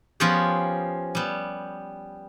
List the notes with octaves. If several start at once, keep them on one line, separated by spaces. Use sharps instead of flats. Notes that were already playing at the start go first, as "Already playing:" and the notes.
F3 B3 C#4 F4 G4 G#4
G3 B3